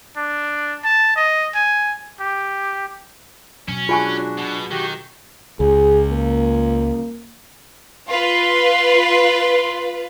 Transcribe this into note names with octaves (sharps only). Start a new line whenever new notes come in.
D4
A5
D#5
G#5
G4
B2 F#3 C#4
D4 F4 F#4 G#4 G#5 C#6
B2
D#3 F#4 G4
C#2 G#4
A#3
F4 B4 C6